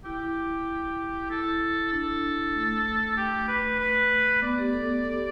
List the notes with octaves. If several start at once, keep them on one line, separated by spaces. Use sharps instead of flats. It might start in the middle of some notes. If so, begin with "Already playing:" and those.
E4 G4
E4 A4
D4 A4
A3
G4
B4
B4
B3 D5
G4
A4
G4
A4
G4